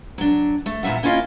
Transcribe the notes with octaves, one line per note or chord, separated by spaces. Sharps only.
F#3 D4
A3
E2 A#2 C#4 E5 F#5
A#3 C#4 E4 F4 D#5 F5